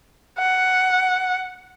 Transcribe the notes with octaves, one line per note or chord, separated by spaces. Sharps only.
F#5